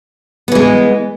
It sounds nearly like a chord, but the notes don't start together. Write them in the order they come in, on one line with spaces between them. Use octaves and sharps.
B3 E3 G#3